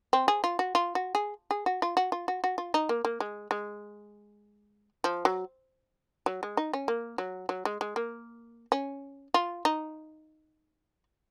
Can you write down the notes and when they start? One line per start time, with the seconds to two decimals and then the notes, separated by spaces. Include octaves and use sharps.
0.13 C4
0.28 G#4
0.44 F4
0.59 F#4
0.75 F4
0.95 F#4
1.15 G#4
1.51 G#4
1.66 F#4
1.82 F4
1.97 F#4
2.12 F4
2.28 F#4
2.44 F#4
2.58 F4
2.74 D#4
2.89 A#3
3.05 A#3
3.20 G#3
3.51 G#3
5.04 F3
5.25 F#3
6.26 F#3
6.43 G#3
6.57 D#4
6.73 C#4
6.88 A#3
7.18 F#3
7.49 F#3
7.65 G#3
7.81 G#3
7.96 A#3
8.72 C#4
9.34 F4
9.65 D#4